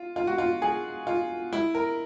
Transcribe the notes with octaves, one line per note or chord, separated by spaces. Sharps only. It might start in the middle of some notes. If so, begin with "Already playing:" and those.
Already playing: F4
F4
F#4
F4
G#4
F4
E4
A#4